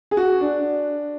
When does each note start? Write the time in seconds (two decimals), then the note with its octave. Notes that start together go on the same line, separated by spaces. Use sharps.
0.11 G#4
0.17 F#4
0.41 D4